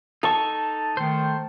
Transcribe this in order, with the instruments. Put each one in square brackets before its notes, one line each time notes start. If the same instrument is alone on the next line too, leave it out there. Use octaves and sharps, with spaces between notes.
[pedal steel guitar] D#4 A4 C#6 [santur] A5
[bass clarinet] D#3 [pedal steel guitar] A3 C5